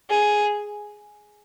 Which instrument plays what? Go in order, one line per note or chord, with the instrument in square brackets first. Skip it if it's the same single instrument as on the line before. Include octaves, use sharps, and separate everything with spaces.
[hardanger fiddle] G#4